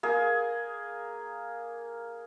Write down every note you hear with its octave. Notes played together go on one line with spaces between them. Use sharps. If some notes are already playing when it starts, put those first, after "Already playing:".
A#3 G#4